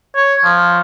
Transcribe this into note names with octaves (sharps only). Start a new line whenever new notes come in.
C#5
F3